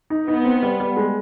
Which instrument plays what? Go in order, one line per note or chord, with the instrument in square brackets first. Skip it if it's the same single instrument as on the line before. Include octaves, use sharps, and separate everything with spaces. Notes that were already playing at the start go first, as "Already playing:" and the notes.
[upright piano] D#4
[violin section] B3 [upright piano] D#4
[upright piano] C4
G3
G3
G#3